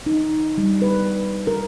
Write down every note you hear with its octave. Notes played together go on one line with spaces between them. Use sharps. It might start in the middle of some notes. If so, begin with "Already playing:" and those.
D#4
G3
B4
A#4